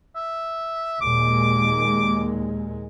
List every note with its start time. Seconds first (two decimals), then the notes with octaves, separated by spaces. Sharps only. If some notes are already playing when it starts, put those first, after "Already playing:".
0.16 E5
1.01 D#2 A#2 G#3 D6